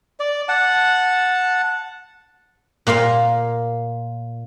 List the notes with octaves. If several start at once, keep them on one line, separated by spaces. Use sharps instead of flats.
D5
F#5 A5
A#2 A#3 F4 F5